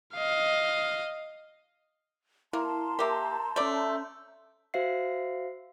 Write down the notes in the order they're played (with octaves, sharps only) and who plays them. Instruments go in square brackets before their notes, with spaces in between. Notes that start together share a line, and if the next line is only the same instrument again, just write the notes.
[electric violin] D#5 F5
[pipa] A#3 [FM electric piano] E4 [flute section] A5 A#5 C6
[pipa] A#3 G4 [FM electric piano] A#4 E5
[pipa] A3 D5 [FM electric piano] C#4 G6
[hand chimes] F#4 C5 E5 F5 C7